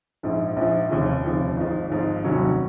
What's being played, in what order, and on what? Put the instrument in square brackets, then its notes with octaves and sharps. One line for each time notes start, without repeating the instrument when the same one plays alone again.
[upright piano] A#1 G#2 F3
A#1 G#2 F3
F1 D#2 C#3 F3
F1 D#2 C#3 F3
G#1 G#2 F3
G#1 G#2 F3
F1 D#2 D#3 F#3 C#4